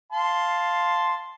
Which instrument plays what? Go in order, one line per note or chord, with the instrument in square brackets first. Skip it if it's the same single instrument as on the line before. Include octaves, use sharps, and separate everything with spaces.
[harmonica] F5 A5 C6